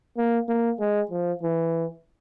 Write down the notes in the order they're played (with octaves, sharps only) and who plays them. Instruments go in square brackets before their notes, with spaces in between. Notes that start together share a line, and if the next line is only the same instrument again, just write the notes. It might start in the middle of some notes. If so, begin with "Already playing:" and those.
[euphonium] A#3
A#3
G#3
F3
E3